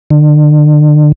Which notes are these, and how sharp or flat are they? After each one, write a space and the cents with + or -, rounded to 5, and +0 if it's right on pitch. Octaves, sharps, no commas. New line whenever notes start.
D3 +35